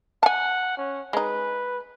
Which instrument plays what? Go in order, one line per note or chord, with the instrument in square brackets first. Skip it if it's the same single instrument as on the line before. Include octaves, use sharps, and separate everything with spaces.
[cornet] F#5 [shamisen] G#5 A5
[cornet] C#4
[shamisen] G#3 D#4 [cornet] B4